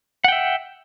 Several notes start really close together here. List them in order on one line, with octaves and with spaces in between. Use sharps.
F#5 G5 E5